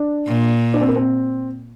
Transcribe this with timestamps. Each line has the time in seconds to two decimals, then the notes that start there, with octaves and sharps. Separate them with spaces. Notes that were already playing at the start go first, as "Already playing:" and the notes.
Already playing: D4
0.27 A#2
0.74 D4
0.81 C4
0.88 A#3
0.96 C4